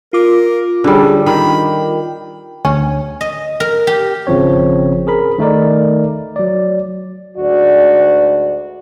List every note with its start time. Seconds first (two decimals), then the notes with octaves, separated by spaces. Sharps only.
0.13 F4 A#4 D6
0.84 D3 G3 C#4 G#4
1.26 D#3 G5 B5
2.65 D2 C#4 G#5
3.21 D#5
3.60 A#4
3.87 G4
4.27 G#1 C#3 F3 C4 C#5
5.07 G#4 A#4 B5
5.39 D#3 A3 D#4 A#4 D5
6.36 F#3 D5
7.38 D2 G#2 F#4 D5